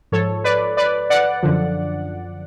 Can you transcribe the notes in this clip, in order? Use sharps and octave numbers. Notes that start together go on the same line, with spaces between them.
G#2 F3 A4 C#5
B4 D5
B4 D5
D5 F#5
F#2 D3 F3